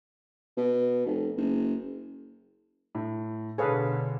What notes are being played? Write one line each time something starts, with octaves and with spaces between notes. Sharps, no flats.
B2
F1
F#1
A2
B2 D3 G#4 A4 B4 C#5 F5